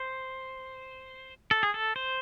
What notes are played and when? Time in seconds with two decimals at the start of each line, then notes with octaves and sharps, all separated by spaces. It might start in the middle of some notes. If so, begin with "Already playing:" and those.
Already playing: C5
1.51 A4
1.63 G#4
1.74 A4
1.96 C5